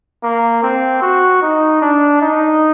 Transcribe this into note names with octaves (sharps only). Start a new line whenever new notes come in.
A#3
C4
F#4
D#4
D4
D#4